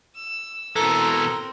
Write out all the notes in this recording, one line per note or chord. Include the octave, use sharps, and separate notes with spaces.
E6
B2 E3 C4 A4 A#4 A#5